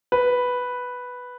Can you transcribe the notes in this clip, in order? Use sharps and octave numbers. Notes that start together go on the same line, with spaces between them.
B4